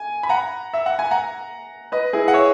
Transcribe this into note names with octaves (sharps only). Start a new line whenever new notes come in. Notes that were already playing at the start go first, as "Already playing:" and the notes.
Already playing: G#5
B5
F#5 A#5
E5
F#5
G#5
F#5 A#5
B4 D#5
E4 G#4
F#5
C#5 E5